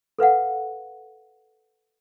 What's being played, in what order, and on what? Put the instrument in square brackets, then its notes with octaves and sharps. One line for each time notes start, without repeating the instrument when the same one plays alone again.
[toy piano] A4 B4 F5 F#5